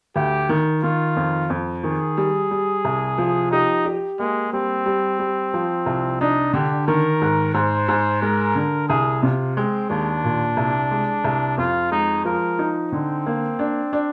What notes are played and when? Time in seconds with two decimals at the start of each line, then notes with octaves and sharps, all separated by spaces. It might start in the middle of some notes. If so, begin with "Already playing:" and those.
0.16 D2 G4
0.49 D#3
0.83 D#3 F4
1.16 F2
1.50 F2
1.83 D#3 G#4
2.17 G3
2.51 G3
2.85 C2
3.18 F3
3.51 D#4 G4
3.85 G4
4.19 G#3 A#3
4.53 G3 C4
4.86 G3
5.19 G3
5.54 F3
5.86 C2
6.21 D4 D#4
6.54 D3 G4
6.87 D#3 A#4
7.22 G#2
7.54 G#2 C5
7.88 G#2
8.22 G#3 A#4
8.55 D3
8.89 C2 G#4
9.23 C3 F4
9.56 G#3 C4
9.90 D#2 D4
10.24 A#2
10.57 C2
10.91 G#3
11.24 C2
11.57 F2 F4
11.91 G#3 D#4
12.25 F3 A#4
12.59 D#4
12.92 D3 C4
13.26 A#3
13.59 D4
13.93 D4